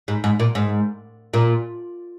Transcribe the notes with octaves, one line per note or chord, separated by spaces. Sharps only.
G#2
G#2
A#2
G#2
A#2